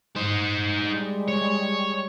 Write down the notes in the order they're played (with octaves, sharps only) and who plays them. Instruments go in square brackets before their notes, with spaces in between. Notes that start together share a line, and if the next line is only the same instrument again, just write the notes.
[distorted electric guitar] D#4 C5
[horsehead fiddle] G3 G#3
[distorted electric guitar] C#5